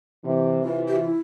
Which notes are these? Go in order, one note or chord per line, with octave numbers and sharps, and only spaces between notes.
C3 E3
C3 E3 F4
G4
F4
E4